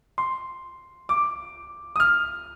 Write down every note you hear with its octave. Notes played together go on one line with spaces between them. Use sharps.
C6
D6
D#6
F6